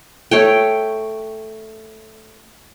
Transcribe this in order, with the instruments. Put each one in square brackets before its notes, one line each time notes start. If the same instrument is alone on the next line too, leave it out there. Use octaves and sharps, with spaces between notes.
[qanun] A3 C#5 G5